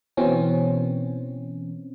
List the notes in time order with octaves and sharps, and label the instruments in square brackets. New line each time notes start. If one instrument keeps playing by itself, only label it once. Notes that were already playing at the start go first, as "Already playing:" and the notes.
[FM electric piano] B2 E3 C4 C#4